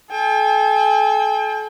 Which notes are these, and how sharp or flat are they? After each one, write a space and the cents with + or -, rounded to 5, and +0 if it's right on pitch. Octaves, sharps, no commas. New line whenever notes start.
A4 -40 G5 +40